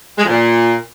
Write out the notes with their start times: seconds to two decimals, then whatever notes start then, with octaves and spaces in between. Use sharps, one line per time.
0.18 G#3
0.23 F2
0.28 A#2